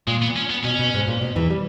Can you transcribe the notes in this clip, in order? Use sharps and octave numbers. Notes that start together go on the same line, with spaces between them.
A#2 G#3
B3
C#4
B3
B2 C#4
B2
G#2
A#2
B2
E2 E3
G3